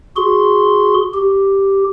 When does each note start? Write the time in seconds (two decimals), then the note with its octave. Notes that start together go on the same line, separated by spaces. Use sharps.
0.17 F#4 G#4 C6
1.14 G4